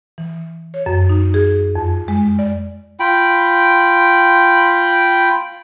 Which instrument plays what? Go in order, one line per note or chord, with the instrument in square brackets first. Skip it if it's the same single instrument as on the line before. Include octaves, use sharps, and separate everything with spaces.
[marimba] E3
C#5
F#2
D#4
G#4
F2
G#3
D5
[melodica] F4 G5 B5